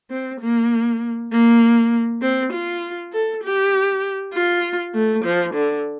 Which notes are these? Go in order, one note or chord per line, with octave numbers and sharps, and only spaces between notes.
C4
A#3
A#3
C4
F4
A4
G4
F4
A3
F3
D3